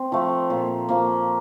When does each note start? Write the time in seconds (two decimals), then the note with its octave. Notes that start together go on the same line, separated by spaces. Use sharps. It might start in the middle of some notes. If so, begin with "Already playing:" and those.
Already playing: C4
0.12 F3 A3
0.50 A#2
0.89 F3 A#3